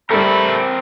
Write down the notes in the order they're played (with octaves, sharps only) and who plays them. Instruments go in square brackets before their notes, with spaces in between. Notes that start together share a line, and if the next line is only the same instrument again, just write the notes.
[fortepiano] G3 A4 [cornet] A3 [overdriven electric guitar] C4 A#4 [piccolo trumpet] B5